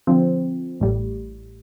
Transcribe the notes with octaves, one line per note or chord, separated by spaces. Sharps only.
D3 F3 C4
A1 A2 G3